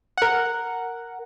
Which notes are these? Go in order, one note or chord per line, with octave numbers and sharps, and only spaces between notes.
A#4 F#5